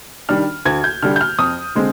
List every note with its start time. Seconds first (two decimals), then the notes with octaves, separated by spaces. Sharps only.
0.29 D#3 G3 D4 F6
0.65 D2 G#6
0.84 G6
1.02 D3 G3 F6
1.16 G6
1.21 F6
1.39 F2 D#6
1.75 D3 G#3 C4